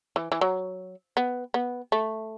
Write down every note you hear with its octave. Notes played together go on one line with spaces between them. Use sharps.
E3
E3
F#3
B3
B3
A3